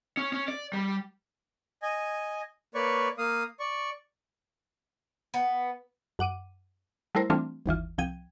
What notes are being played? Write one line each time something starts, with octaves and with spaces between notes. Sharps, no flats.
C#4
C#4
D5
G3
D#5 G#5
A#3 B4 C#5 D5 C#6
A#3 F5 D#6
D5 C#6
B3
F#2 F#5 D6 D#7
G3 A3 E4 A#4 C5
E3 G3 A3 C4 D4 F4
G1 D#2 E3 F4
C2 F3 G5 G#6 D#7